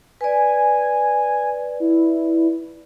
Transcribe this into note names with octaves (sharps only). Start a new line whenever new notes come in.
B4 D5 G#5
E4